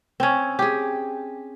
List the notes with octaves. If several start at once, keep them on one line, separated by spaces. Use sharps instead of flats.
C4 C#4
G4 G#4